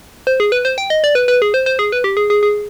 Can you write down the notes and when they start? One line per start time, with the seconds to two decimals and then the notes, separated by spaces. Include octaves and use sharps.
0.27 C5
0.40 G#4
0.52 B4
0.65 C5
0.78 G5
0.90 D#5
1.04 D5
1.15 B4
1.28 B4
1.42 G#4
1.54 C5
1.66 C5
1.79 G#4
1.92 B4
2.04 G4
2.17 G#4
2.30 G#4
2.43 G#4